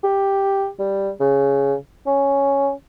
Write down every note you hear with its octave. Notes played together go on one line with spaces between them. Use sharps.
G4
G3
C#3
C#4